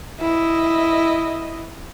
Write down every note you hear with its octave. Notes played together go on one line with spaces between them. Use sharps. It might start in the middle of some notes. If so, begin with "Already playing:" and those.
E4 D#5